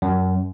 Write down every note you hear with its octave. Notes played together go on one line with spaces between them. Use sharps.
F#2